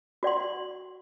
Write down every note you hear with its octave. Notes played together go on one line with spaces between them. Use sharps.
F#4 D5 F#5 C6